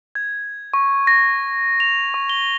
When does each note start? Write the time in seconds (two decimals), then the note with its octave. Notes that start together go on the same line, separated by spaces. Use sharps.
0.15 G#6
0.74 C#6
1.07 A#6
1.80 F7
2.14 C#6
2.29 G7